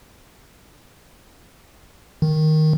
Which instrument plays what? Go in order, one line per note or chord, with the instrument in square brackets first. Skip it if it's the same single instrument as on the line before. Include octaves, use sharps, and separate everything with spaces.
[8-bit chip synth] D#3